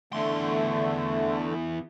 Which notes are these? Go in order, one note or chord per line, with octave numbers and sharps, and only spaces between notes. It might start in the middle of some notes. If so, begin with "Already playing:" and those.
E2 D3 A3 C6